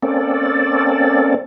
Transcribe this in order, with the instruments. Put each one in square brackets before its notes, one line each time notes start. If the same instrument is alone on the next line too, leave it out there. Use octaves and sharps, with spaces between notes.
[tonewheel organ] A#3 C4 C#4 A4 D5